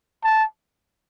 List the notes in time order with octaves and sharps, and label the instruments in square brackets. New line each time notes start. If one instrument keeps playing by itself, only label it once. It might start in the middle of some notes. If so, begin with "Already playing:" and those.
[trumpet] A5